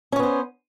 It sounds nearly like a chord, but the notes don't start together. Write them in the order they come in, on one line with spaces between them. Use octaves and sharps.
C#4 C#5 B3 C5